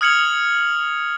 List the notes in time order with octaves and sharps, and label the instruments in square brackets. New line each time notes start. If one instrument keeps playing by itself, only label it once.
[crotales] D#6 F6 G#6 C#7 F7 F#7